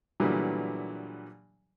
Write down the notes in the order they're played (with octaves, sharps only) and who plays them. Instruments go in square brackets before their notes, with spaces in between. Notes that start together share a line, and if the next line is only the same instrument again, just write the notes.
[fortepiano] A#2 D3 E3 F#3 G3 B3